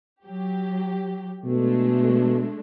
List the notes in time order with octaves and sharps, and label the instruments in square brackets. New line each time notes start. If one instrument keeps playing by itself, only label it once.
[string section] F#3 G4
[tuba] B2 [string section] G#3 A3 D4